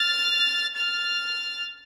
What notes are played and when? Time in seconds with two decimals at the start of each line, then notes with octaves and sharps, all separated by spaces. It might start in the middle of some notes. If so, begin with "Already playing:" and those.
Already playing: F6 A6
0.76 F6 A6